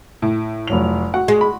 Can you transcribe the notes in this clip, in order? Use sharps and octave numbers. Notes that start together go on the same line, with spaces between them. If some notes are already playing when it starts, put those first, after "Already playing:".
A2
F1 F#3 F7
F#4 F#5
G#3
B5